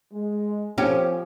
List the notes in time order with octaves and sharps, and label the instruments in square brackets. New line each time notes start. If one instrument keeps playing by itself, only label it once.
[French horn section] G#3
[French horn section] F3 C4 [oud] C#4 G4